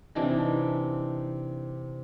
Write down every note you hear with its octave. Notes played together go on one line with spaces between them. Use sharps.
C3 E3 D4 D#4